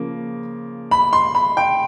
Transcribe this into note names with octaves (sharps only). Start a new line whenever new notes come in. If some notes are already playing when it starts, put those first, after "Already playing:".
Already playing: C#3 F3 A#3
B5
C6
B5
G5